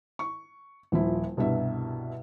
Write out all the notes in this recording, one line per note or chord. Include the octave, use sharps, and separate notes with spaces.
C#6
D#1 F3 E4
C2 G2 B2 E5